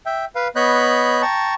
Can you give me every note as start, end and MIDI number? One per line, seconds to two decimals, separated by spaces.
0.06 0.25 76
0.06 0.25 79
0.35 0.48 71
0.35 0.48 77
0.56 1.22 59
0.56 1.22 73
0.56 1.22 75
0.56 1.22 83
0.56 1.22 90
0.56 1.22 91
1.22 1.54 79
1.22 1.54 81
1.22 1.54 82
1.22 1.54 85